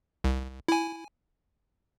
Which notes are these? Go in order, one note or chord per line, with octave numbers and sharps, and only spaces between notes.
C2
E4 G#5